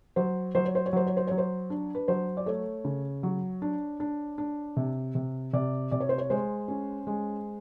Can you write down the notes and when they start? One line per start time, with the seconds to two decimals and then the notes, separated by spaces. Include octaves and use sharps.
0.16 F#3 C5
0.55 F#3 C5
0.65 C#5
0.75 C5
0.86 C#5
0.93 F#3 C5
1.07 C#5
1.17 C5
1.27 F#3 C#5
1.38 C5
1.70 D4
1.95 B4
2.08 F#3 C5
2.37 D5
2.46 A3 C#5
2.85 C#3
3.23 F#3
3.62 D4
4.00 D4
4.38 D4
4.77 C3
5.15 C3
5.53 C3 D5
5.91 C3 D5
6.00 C#5
6.09 C5
6.18 C#5
6.30 G#3 C5
6.68 C#4
7.07 G#3